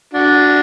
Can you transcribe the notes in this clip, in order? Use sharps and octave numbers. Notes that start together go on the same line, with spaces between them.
D4 F#4